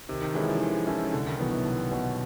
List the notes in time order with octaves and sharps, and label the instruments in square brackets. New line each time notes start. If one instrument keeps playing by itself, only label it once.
[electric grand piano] C3 [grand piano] D#3
[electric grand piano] D#3
[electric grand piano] E3 [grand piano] G#3 C#4 E4 A4
[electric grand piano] F3
[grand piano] D#3 [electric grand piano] F3
[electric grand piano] E3 [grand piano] G#3 C#4 E4 A4
[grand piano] C2 [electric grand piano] D3
[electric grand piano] D#3
[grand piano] B2 F#3 B3 [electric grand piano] E3
[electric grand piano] E3
[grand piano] C2
B2 F#3 B3